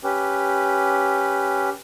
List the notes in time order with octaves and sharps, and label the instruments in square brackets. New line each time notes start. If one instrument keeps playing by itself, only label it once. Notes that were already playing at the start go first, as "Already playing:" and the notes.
[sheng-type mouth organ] C#4 G4 B4